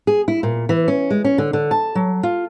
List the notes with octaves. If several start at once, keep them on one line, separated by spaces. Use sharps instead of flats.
G#4
E4
A#2
E3
C#4
G#3
C#4
D3
D3
A5
F#3
F4